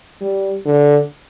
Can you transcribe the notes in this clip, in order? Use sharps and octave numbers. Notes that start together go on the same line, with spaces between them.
G3
D3